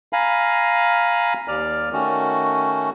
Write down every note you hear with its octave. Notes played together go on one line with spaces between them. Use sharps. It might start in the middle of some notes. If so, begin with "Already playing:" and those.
F5 G#5 A#5 B5
D#2 D5 F6
D#3 A3 C#4 F#4